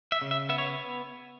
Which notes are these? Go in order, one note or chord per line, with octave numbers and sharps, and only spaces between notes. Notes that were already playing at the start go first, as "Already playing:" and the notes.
E5
C#3
E5
B3 E5
C#5